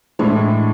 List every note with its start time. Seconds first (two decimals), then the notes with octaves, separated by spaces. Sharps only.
0.19 A2 E3 G#3 D4 E4